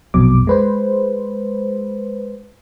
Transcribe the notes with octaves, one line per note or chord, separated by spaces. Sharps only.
A#1 F2 B2 F#3 D6
G#3 B4 C5